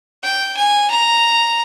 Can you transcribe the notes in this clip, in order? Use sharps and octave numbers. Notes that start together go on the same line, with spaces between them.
G5
G#5
A#5